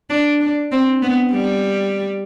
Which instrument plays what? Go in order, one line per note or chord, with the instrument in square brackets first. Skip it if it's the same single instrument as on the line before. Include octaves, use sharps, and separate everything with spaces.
[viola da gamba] D4
D4
C4
B3
G3